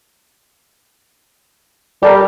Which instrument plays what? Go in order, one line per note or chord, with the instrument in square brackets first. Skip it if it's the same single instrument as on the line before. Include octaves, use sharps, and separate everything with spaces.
[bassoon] G3 [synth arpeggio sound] G4 A4 A#4